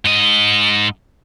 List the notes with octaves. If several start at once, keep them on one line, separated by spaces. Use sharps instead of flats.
G#2 D#5